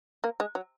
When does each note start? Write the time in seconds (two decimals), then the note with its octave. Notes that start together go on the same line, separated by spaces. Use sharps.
0.24 A#3
0.40 G#3
0.55 F#3